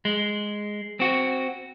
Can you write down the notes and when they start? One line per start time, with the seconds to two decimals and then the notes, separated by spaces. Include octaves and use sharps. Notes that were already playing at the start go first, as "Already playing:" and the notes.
0.05 G#3
1.00 C4 F#4